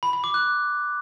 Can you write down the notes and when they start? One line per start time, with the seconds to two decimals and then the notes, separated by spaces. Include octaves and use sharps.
0.03 B5
0.13 B5
0.24 D6
0.34 F#6